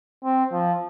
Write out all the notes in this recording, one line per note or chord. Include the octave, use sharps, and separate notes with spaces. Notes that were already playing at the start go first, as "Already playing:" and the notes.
C4
F3